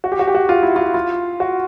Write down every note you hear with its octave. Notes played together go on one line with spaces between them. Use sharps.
F#4
G4
F#4
G4
F#4
F4
E4
F4
F4
F#4